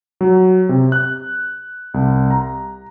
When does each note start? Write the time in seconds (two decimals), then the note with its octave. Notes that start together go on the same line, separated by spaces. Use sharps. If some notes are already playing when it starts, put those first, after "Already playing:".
0.21 F#3
0.69 C3
0.92 F#6
1.94 C2
2.31 A#5